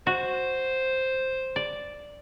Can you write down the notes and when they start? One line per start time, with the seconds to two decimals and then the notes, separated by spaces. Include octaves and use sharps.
0.07 F#4 C5
1.56 D5